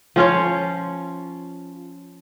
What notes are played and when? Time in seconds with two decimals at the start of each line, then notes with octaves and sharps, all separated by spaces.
0.16 F3 C#4 F4 C#5